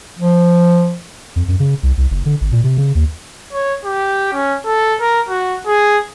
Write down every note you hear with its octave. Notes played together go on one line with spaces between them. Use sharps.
F3
F2
F#2
C#3
C2
C2
F#1
D3
G#1
A#2
C3
C#3
D#2
C#5
G4
C#4
A4
A#4
F#4
G#4